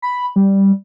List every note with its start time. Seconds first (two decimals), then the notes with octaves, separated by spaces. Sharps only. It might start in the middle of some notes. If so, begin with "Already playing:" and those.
0.02 B5
0.36 G3